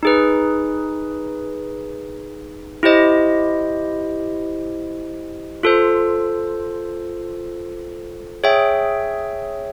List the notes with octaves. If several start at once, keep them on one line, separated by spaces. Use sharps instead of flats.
D#4 G#4 B4
E4 G4 C5 D#5
F4 A4 C5
G#4 C#5 E5 G5